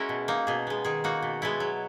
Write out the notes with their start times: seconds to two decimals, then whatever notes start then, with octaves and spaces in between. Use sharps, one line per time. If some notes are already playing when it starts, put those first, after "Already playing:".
Already playing: G#3 C#4 E4 F#4 A#4
0.09 B2
0.28 A#3 D#4
0.47 B2 G#4
0.67 G#3 B3
0.85 D#3 G#4
1.04 A#3 D#4 F#4
1.22 B2
1.42 G#3 B3 E4
1.60 F#3